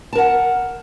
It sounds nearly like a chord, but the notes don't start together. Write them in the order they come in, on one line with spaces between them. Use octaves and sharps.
A5 A#4 F#5